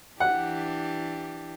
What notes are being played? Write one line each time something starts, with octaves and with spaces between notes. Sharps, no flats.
E3 D4 G4 F#5